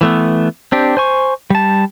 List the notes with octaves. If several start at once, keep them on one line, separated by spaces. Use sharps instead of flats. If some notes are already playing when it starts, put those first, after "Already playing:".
E3 A3 B3
C4 D4 G4
C5 G#5 C#6
G3 A5